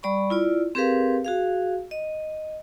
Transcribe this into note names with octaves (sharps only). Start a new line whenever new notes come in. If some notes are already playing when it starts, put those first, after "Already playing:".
G3 D5 B5 C#6
E4 F4 D5
C4 G4 G#4 A#4 B4 F5
F#4 G#4 F5
D#5